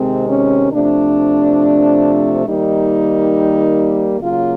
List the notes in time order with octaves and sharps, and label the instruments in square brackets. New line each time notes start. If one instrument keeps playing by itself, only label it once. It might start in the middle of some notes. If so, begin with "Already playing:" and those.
Already playing: [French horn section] C3 D#3 G#3 C4
C#4
C3 F3 A3 D4
D#3 G3 A#3 D#4
C#3 F#3 A#3 F4